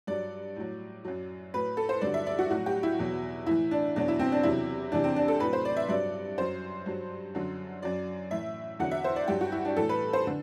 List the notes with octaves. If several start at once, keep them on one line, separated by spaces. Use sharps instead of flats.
G2 F#3 D5
A2 F#3
F#2 F#3
A2 F#3 B4
A4
C5
G2 D3 F#3 D5
E5
D5
F#4
A2 F#3 F#4
G4
E4
E2 B2 F#3
A2 E3 E4
D4
E2 B2 F#3 D4
E4
C4
D4
E2 C3 F#3 E4
E2 C3 E3 D4
C4
D4
A4
A2 F#3 B4
C5
D5
E5
G2 F#3 D5
F#2 F#3 C5
G2 F#3
F#2 D3 F#3
F#2 F#3 D5
A2 E3 E5
E2 D3 F#3 F#5
E5
C5
D5
G2 F#3 G4
F#4
E4
D4
A2 E3 A4
B4
C5
D3